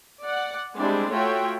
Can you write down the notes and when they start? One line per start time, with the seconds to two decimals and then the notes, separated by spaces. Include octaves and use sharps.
0.24 D5 F#5
0.77 G3 G#3 C4 D4 E4
1.10 A3 F4 F#4 C#5 E5 G5